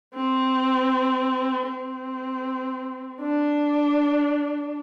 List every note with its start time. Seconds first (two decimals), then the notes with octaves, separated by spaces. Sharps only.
0.15 C4
1.68 C4
3.21 D4